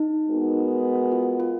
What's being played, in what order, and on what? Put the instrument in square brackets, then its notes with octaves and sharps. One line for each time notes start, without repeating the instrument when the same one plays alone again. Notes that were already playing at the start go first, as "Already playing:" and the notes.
Already playing: [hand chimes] D#4
[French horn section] G#3 B3 F#4 A#4
[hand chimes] F4
F4